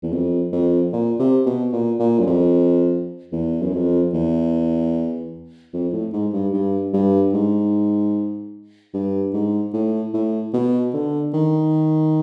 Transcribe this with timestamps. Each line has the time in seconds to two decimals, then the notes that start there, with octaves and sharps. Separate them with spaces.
0.03 E2
0.12 F2
0.52 F2
0.93 A#2
1.19 C3
1.46 B2
1.73 A#2
1.99 A#2
2.19 F#2
2.26 F2
3.33 E2
3.62 F#2
3.73 F2
4.13 E2
5.74 F2
5.93 A2
6.13 G#2
6.33 G2
6.53 G2
6.93 G2
7.33 G#2
8.94 G2
9.34 G#2
9.73 A2
10.14 A2
10.54 B2
10.94 D3
11.34 D#3